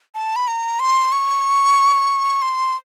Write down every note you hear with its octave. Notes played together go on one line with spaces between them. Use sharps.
A5
B5
A#5
C6
C#6
C6